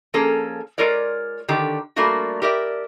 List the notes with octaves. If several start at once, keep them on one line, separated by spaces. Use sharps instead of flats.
F3 A#3 C#4 G#4 A4
G#3 F4 A#4 C#5 D5
D3 D#3 G4
G3 A3 A#3 D4 F4 F#4
G4 A#4 D5 E5